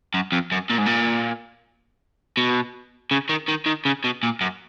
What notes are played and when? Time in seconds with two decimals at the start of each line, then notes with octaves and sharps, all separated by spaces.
0.14 F#2
0.32 F2
0.52 F#2
0.70 A#2
0.78 G#2
0.86 A#2
2.37 B2
3.11 C#3
3.29 D#3
3.48 D#3
3.66 D#3
3.85 C#3
4.04 B2
4.23 A#2
4.41 F#2